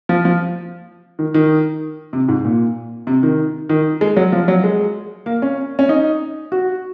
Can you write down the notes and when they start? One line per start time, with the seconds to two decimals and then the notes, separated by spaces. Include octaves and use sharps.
0.09 F3
0.25 F3
1.19 D#3
1.34 D#3
2.13 C3
2.28 G#2
2.45 A#2
3.07 C3
3.23 D#3
3.69 D#3
4.01 G#3
4.17 F#3
4.32 F3
4.48 F#3
4.64 G#3
5.26 A#3
5.42 C#4
5.79 C#4
5.89 D#4
6.52 F#4